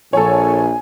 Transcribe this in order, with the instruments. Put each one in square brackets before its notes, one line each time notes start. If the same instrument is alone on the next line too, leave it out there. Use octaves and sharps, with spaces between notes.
[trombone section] A#1 [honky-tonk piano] A4 C#5 [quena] G#5